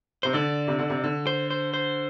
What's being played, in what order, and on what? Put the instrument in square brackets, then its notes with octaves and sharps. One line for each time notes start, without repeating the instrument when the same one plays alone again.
[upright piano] C3 [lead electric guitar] C5
[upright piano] D3 [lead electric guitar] D5
[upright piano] C3
D3
C3
D3
[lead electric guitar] C5
C5
C5